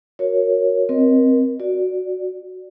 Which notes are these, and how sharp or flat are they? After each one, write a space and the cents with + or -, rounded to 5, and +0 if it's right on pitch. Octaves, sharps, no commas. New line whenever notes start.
F#4 -10 A#4 +0 C#5 +0
C4 +0 A#4 +25 D#5 +0
F#4 -5 D5 +0